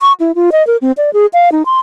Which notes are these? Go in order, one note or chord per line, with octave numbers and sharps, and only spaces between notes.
C#6
E4
F4
D#5
A#4
C4
D5
G#4
F5
D#4
C6